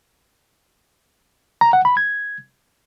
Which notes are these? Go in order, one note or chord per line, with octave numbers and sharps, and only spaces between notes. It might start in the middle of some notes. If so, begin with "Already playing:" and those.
A#5
F#5
B5
G#6